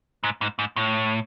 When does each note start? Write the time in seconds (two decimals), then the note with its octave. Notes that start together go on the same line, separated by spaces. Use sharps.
0.24 G#2
0.41 G#2
0.59 G#2
0.76 A2